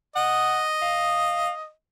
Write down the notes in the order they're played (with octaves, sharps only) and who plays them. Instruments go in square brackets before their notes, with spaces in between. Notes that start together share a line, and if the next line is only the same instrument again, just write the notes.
[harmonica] D#5 [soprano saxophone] F#5
[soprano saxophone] F5